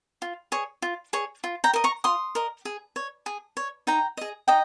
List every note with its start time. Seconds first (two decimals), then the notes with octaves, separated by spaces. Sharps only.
0.22 F4
0.52 G#4 C#5
0.82 F4
1.13 G#4 C#5
1.44 F4
1.64 G5 A#5
1.74 A#4 D#5
1.84 A#5 C#6
2.04 F4 C6 D#6
2.35 A#4 D#5
2.65 G#4
2.96 C#5
3.26 G#4
3.57 C#5
3.87 D#4 G5 A#5
4.17 G#4 D#5
4.48 D#4 D#5 G5